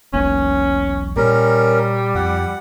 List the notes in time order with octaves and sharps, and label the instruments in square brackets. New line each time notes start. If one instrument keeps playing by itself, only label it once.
[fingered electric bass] E1 B1 A#3 [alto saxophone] C#4
[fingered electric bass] A#2 [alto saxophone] G3 [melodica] C#4 A#4
[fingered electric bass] F2 [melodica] F#5